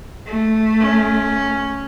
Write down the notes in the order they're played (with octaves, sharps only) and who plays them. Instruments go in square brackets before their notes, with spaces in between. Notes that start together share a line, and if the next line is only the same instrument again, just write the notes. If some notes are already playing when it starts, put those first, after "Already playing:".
[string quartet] A3
[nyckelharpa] C#4